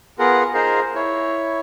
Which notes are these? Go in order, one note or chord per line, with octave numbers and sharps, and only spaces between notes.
B3 F4 G#4 A#4 F#5
D#4 F4 G#4 A#4 C5 F5
E4 C#5